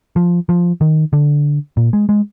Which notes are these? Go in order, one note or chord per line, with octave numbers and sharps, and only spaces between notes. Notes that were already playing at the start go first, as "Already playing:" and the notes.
F3
F3
D#3
D3
A#2
G#3
G#3